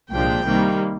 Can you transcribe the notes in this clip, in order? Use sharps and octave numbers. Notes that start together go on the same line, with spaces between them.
C2 A#2 F3 G#3 D4 G5
C2 C3 D#3 G3 A#3